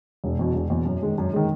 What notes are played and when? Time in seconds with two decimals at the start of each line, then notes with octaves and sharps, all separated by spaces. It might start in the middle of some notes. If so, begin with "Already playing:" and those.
0.24 E1
0.39 E2 B2
0.54 E1
0.70 E2 B2
0.86 F#2
1.03 D#3 G#3
1.18 F#2
1.33 D#3 G#3